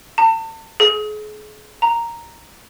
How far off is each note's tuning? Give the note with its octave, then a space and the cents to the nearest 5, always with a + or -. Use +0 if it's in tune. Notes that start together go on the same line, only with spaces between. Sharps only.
A5 +40
G#4 +40
A#5 -5